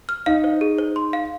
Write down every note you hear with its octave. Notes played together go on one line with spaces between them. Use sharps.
F6
D#4 F5
C5
G#4
C5
C6
F5